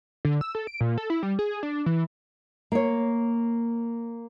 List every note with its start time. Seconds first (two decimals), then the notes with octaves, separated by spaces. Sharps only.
0.25 D3
0.41 E6
0.55 A4
0.67 D7
0.81 A#2
0.98 A4
1.10 E4
1.23 G3
1.39 G#4
1.63 D4
1.86 E3
2.72 A#3 C#5